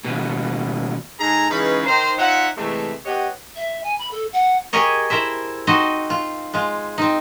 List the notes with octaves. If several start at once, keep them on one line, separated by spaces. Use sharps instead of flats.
D#2 B2
G#2 D#4 G#4 A4 G#5 A#5
C#3 E3 G#3 C#4 D#4 B4
D#3 C5 A#5
D#4 F4 C#5 E5 F#5
C3 E3 G#3 A3
B3 G4 C#5 D#5 F#5
E5
G#5
B5
A4
F#5
G4 G#4 A#4 C#5 D#5
E4 A#4 C5 E5
C4 D#4 F#4 C5 D#5
F4
G#3 F4
C4 D#4